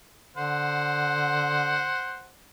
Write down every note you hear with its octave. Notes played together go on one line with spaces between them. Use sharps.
D3 C5 F#5